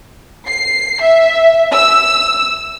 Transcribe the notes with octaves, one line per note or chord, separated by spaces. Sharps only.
C7
E5
E6